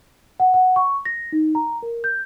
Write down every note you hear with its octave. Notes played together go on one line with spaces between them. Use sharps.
F#5
F#5
C#6
A#6
D#4
A#5
A#4
G6